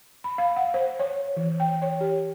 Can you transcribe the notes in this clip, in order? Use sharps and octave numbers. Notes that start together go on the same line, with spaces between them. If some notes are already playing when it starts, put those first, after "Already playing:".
B5
F5
F#5
C5
C#5
E3
G5
C#5
G4